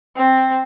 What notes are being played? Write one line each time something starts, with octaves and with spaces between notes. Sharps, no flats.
C4